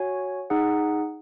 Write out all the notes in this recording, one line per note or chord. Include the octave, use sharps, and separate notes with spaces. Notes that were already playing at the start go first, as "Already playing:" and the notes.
Already playing: F#4 C#5 G#5
D#4 G#4 F#5